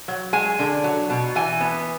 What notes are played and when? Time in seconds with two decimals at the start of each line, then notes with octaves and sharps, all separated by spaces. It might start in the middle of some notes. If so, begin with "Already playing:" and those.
0.08 F#3
0.33 G#3 G#5
0.59 D3
0.84 F#3
1.10 B2
1.36 E3 G#5
1.61 B3